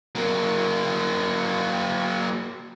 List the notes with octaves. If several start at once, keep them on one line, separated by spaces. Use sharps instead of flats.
F#3 A#3